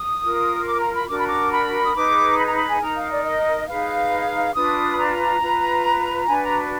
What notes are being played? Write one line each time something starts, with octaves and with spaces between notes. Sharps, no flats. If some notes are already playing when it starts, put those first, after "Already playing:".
Already playing: D#6
F4 A#4
D6
A#5
B5
D4 F#4 A#4 D6
B5
D6
B5
D#6
D#4 G#4 B4 D6
B5
A#5
B5
G#5
D#4 A#4 A#5
F5
D5
D#5
D#4 G#4 B4 F5
D4 F4 B4 D#6
B5
A#5
F4 B4
D4 F#4 B4 G#5
A#5